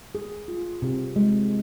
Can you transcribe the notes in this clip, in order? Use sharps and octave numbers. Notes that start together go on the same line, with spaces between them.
G#4
F4
C3
G#3